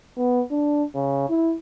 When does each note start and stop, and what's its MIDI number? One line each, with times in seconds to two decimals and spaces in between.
0.17 0.42 59
0.50 0.83 62
0.95 1.29 49
1.29 1.54 64